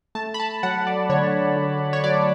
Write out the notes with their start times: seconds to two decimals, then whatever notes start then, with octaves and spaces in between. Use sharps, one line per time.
0.15 A3 A5
0.34 B5
0.40 A5
0.63 F#3 F#5
0.87 D5
1.10 D3 C#5
1.56 D3
1.93 C#5
2.04 F#3 D5